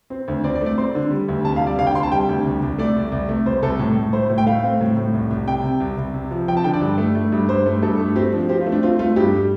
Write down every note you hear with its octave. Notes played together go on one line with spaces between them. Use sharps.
C4
D2
C4 D5
D5
A3
D5
C4 C6
D3
G3
D2
C3 A5
F5
G3
D5
D2 F5
G5
C3 C6
A5
G3 G5
D2
C2
C2
A3 D5
C2
C2
A3
C2 C5
C2 A4
A2
A2
A3 C5
A2
G5
A3 F5
C4
A2
A2
C2
C2
C3 G5
C3
C2
C2
C3
F3
F3 G5
A5
D3 G5
D5
G2
A3
A3
G2
G2 C5
A3
G2 A4
A3
C4 G4
F3 D4
C4 G4
F4
A3
D4
C4 F4
A3 F4
G2 G4
G3